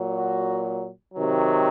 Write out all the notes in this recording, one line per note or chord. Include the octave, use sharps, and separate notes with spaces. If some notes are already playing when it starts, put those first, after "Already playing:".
Already playing: A#2 F#3
F#4
C3 D#3 F#3